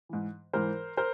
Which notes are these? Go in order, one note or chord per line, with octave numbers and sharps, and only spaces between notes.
G#2 E3
G#2 E3 A#4 C5
A#4 C5